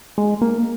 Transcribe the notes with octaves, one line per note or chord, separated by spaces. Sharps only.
G#3
A#3